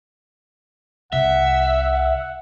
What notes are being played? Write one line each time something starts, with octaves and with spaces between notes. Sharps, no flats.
C2 C3 E5 F#5